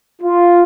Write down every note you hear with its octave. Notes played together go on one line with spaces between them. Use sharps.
F4